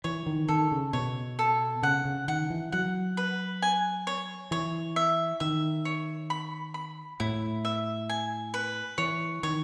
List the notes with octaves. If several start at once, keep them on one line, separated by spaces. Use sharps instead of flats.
E3 C#5
D#3
D#3 A4
C#3
B2 C#5
A4
C#3 F#5
C#3
D#3 F#5
E3
F#3 F#5
B4
G#5
C#5
E3 C#5
E5
D#3 E5
C#5
B5
B5
A2 E4
E5
G#5
B4
E3 C#5
D#3 C#5